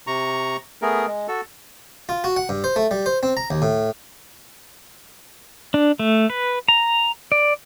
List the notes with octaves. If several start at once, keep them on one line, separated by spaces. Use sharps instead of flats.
C3 A#5 C#6
A3 B3 G#4 A#4
G#3
F#4 A4
F4
F#4
F#5
G2
C5
A3
G3
C5
C4
A#5
D#2
A2
D4
A3
B4
A#5
D5